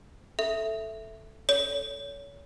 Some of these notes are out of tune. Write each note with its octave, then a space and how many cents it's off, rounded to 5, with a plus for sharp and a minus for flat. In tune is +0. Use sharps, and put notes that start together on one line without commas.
A4 +0 E5 +0
A4 +0 C#5 +30